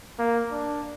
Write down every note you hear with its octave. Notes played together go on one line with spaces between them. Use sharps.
A#3
D4